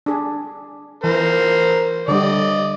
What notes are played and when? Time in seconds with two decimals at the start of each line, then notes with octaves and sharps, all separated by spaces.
0.06 D4 G#4
1.04 E3 A#4 C5
2.08 D3 G3 D5 D#5